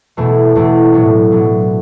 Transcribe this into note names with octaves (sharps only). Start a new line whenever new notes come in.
E2 B2 A3 E4
E2 B2 A3 E4
A2 F#3 B3 D4
A2 F#3 B3 D4